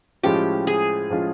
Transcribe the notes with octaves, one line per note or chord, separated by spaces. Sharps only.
A2 F3 G#3 C#4 F4 G4
G#4
A2 F3 G#3 C#4 F4